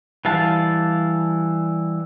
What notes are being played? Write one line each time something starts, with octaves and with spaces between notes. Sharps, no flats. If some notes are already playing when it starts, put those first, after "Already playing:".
E3 G3 F5 A5